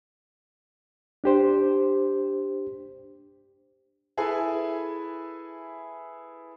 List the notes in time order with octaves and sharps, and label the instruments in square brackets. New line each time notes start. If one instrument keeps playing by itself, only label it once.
[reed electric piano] D4 G4 C5
[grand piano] E4 G#4 A4 B4 E5 G#5